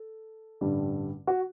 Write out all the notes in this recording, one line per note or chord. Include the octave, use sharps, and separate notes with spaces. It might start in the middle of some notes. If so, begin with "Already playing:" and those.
Already playing: A4
A1 G2 D3 G3
F#4